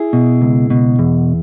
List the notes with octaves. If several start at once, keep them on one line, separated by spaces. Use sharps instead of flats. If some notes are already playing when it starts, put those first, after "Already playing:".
Already playing: E4 G#4
B2
C#2
B2
E2